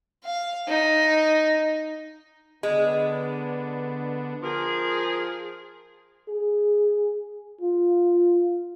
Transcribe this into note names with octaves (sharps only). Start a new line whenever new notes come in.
F5
D#4
D3 G#3 B3 D4
F3 G#4 A#4
G#4
F4